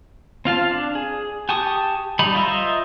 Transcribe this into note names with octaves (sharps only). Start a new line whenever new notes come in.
C4 F4 F5 A5
D4
G#4
G4 G#5 A5 C#6 D#6
G3 D#4 B5
F4 C5 D#5 E5 A#5